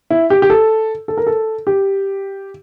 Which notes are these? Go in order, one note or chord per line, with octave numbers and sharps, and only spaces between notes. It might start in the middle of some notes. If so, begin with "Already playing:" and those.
E4
G4
G4
A4
A4
A#4
A4
G4